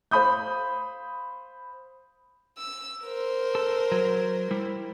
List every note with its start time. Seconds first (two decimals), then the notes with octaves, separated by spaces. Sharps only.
0.11 C5 F5 B5 D#6 G6
2.58 E6
3.03 A#4 C5
3.55 A4
3.92 F#3
4.51 G3 E4